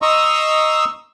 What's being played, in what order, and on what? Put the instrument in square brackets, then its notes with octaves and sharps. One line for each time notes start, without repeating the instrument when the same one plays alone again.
[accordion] D#5 A#5 C6 C#6 D#6 E6